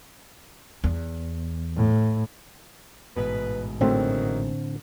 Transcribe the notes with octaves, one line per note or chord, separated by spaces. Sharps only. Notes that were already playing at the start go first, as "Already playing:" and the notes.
E2
A2
A1 G#2 B2 B4
E2 A2 D3 D#3 F#3 A3 C4